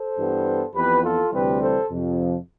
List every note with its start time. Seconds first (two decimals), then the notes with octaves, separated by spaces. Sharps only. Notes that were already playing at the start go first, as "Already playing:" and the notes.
Already playing: A4 C5
0.17 G2 E3 G3 B3
0.74 F2 E3 B3 G4 B4
1.03 F4 A4
1.32 D2 C3 E3 G3 C4 G4 B4
1.61 A4 C5
1.90 F2 C3 F3